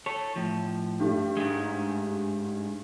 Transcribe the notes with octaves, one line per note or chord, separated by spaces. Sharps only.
A4 C#5
A2 F3
G2 G3 A3
G#2 G#3